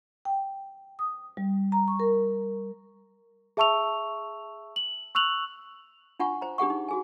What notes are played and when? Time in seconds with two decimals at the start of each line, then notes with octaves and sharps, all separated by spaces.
0.25 G5
0.99 D#6
1.37 G3
1.72 A#5
1.88 C#6
2.00 A#4
3.57 G#4 E5 A5 C#6 E6 F7
4.76 F#7
5.15 C#6 E6 F#6 F7 F#7
6.19 D4 F4 F#5 G#5 C#6
6.41 C5 A#5
6.58 D4 G4 G#4 F#5 C#6
6.70 D#4
6.89 F#4 G#4 G#5